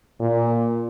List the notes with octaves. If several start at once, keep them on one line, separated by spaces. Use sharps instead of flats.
A#2